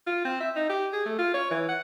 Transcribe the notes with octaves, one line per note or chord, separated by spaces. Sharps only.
F4
C4
E5
D#4
G4
G#4
A3
F4
C#5
E3
F#5